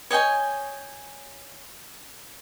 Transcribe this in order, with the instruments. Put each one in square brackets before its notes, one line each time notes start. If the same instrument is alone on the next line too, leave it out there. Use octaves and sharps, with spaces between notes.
[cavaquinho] C#5 D#5 G5 G#5